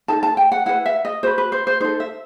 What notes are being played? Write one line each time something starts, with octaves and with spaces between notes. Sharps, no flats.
D#4 A4 A5
A5
G5
F#5
E4 B4 F#5
E5
D#5
F#4 B4 C5
B4
C5
C5
D#4 A4 C5
E5